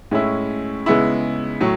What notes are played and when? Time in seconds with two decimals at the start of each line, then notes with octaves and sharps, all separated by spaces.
0.11 A2 G#3 C#4 E4
0.86 C#3 G#3 B3 E4
1.61 A2 F#3